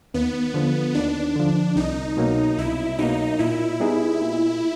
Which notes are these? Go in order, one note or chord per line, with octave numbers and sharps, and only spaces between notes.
D#2 B3
D3 F3
D#2 D4
D3 F3
C2 D#4
B2 F#3 A#3
C2 E4
B2 F#3 A#3 D#4
A#2 E4
G3 B3 D#4 G#4
A#2